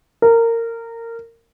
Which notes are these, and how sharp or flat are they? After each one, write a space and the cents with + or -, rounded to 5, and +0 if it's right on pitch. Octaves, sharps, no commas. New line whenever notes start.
A#4 -20